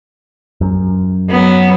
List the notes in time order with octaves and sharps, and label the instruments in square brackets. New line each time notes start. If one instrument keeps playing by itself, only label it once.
[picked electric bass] F#2
[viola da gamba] F#3 B3